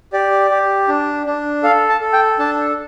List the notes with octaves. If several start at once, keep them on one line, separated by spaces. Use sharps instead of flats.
G4 D5
G4
D4
D4
A4 F5
A5
A4
G5
D4 A5